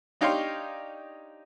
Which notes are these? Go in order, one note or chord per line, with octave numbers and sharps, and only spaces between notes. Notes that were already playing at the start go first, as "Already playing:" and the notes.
D4 D#4 G4 C#5 F5 C6